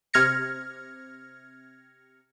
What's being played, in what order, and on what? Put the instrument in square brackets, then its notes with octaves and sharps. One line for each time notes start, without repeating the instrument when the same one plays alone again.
[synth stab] C3 F6 G#6 A#6 C#7